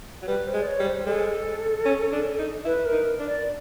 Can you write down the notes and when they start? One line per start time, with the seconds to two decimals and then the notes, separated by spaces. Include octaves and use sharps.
0.23 F#3
0.27 G3 B4
0.47 C5
0.54 G#3
0.61 D5
0.67 C#5
0.79 G3
0.86 C5
1.06 G#3 A4
1.86 C#4
2.12 D4
2.39 D#4
2.65 E4 B4
2.85 A#4
2.92 D#4
3.19 D4
3.26 D5